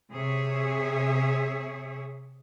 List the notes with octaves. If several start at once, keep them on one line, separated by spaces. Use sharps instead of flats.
C3 G#4 C#5 E5